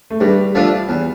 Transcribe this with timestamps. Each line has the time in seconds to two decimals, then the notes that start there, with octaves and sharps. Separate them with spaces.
0.10 A3
0.20 G2 G3
0.55 F3 A3 D4 F4
0.89 E2